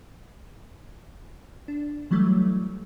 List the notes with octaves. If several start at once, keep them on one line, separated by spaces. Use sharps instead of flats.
D4
E3 F#3 G3 A3